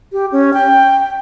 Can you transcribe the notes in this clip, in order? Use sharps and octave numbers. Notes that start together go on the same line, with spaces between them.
G4
C#4
G5